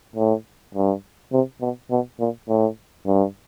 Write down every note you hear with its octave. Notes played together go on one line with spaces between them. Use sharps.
A2
G2
C3
B2
B2
A#2
A2
G2